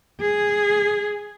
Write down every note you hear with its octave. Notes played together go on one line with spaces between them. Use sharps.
G#4